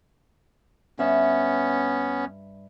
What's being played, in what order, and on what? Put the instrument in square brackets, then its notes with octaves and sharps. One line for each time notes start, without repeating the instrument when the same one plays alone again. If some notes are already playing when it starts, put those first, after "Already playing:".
[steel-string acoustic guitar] G2 E5 [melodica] B3 C#4